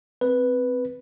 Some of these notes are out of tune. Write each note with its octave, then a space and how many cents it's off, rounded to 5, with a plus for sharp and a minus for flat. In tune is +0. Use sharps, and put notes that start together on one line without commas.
C4 -10 B4 +0